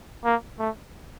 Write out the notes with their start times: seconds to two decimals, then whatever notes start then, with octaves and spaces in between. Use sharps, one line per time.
0.25 A#3
0.59 A3